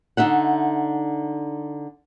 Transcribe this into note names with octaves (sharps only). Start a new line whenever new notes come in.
D3 D#4 E5 F#5